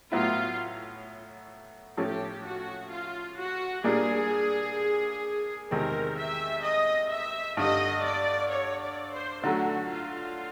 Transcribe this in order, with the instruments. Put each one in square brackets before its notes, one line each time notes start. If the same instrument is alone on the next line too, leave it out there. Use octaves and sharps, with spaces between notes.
[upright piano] A2 F#3 B3 E4 [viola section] F4
[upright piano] A2 F3 A3 C#4 [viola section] G4
[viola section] F#4
F4
F#4
[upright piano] A#2 G3 A#3 D4 [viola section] G#4
[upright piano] E2 C3 D#3 G#3 C4 [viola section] A#4
[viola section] E5
D#5
E5
[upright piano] G2 D3 G3 [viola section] D#5
[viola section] D5
C#5
D5
C5
[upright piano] D3 F#3 A3 [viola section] F#4
[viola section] F4